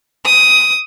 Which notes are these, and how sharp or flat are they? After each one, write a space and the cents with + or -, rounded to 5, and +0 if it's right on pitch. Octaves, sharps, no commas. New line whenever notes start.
D#6 +15